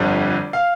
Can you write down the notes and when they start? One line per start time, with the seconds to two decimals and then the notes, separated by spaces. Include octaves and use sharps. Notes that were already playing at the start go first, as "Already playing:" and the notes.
Already playing: G1 F2 D3 G3 D5
0.53 F5